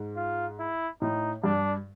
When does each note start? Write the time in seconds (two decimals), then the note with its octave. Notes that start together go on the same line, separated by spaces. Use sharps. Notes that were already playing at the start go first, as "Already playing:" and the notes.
Already playing: G#2
0.16 F4
0.59 E4
1.02 A2 D#4
1.43 G2 D4